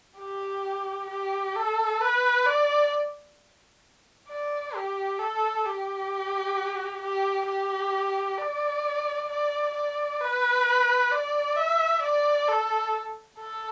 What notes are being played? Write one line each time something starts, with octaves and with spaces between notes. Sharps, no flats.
G4
G4
A4
B4
D5
D5
G4
A4
G4
G4
G4
D5
D5
D5
B4
D5
E5
D5
A4
A4